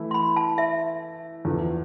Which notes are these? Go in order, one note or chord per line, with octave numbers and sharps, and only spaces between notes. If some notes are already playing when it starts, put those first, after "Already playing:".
Already playing: E3 A3 E4
C6
B5
A5
E5
E2 D3 F3